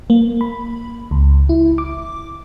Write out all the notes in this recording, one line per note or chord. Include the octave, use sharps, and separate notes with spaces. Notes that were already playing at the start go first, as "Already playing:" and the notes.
A#3
B5
C#2
E4
D6